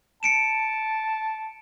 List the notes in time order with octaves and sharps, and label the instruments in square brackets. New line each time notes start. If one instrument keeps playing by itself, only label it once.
[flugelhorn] A5 [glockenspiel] C#7 D7 E7